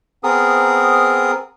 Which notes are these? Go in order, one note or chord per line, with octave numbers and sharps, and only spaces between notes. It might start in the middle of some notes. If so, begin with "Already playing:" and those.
B3 C4 G#4 A#4 D#6